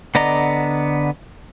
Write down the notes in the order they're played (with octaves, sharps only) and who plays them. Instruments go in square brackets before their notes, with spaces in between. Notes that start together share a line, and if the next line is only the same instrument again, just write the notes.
[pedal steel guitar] D3 B3 D5 D#5 A#5